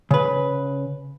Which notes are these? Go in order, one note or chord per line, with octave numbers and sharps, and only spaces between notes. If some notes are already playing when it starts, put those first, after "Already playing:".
C#3 B4